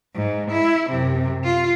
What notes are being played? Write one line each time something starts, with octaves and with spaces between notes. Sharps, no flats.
G#2
E4
F#2 C3
F4